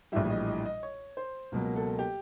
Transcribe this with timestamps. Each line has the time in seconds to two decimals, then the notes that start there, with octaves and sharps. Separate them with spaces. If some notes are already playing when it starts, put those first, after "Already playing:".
0.12 A#1 A2 E3 G3 E5
0.30 D#5
0.47 D#5
0.66 D#5
0.83 C#5
1.17 C5
1.52 C#2 B2 F#3 A#3 A#4
1.76 A4
1.99 G4